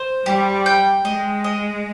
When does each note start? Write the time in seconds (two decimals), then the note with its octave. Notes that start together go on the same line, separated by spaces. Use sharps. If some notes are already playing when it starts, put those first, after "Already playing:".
Already playing: C5
0.26 G3 G4
0.66 G5
1.05 G#3 D#5
1.44 D#5